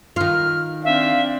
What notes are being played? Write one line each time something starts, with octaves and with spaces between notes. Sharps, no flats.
D#3 F4 F6
C4 D4 E5 F5